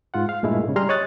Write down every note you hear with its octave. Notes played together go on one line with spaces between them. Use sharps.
G#2 F4 F#5
F5
G2 A#2 G#3 A3 E4
G#2 C#3
G3 G#4 A#5 C6 F6
C#5 D#5 D#6 F#6 A6